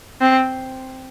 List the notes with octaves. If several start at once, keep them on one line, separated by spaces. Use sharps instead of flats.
C4